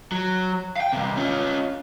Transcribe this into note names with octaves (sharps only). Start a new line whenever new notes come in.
F#3
F5 G5
G2 C3
C#4 F4